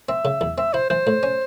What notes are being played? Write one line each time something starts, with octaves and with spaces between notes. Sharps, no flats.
C4 E5
C#3
E2
C4 E5
E4 C5
E3 C5
A2
C#4